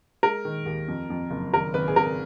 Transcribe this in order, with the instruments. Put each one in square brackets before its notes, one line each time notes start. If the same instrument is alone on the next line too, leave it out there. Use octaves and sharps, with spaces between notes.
[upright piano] G#3 A#4
D#3
D#2
F2
F2
F#1
G#1 A#4
G#1 B4
G#4
G#1 A#4